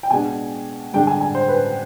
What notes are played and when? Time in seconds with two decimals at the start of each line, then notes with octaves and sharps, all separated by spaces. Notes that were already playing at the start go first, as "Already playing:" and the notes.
0.03 G5
0.10 B2 G#3 D4 G#5
0.93 G2 D3 G#3 D4 G5
1.07 G#5
1.21 G#5
1.35 C5
1.48 B4